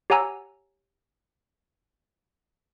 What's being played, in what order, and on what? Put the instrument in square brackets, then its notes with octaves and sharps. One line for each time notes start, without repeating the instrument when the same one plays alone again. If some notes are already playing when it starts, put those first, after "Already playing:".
[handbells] G4 C#5 F#5 G#5 A#5 E6